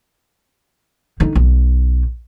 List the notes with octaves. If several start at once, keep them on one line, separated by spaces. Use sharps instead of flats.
D3 D#4
B1